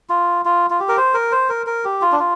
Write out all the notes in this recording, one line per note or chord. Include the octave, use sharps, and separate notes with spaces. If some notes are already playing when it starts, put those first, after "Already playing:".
F4
F4
F4
G4
A#4
C5
A#4
C5
A#4
A#4
G4
F4
D4
F4